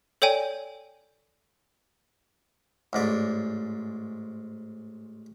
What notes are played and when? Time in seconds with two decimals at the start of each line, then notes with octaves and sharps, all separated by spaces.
0.22 A4 C#5 D5 G5 G#5
2.93 A1 G#2 D5